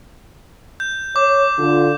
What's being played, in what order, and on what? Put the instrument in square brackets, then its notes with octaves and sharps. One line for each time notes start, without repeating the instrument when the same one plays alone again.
[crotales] G6
[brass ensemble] C#5 [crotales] D6
[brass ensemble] D3 F4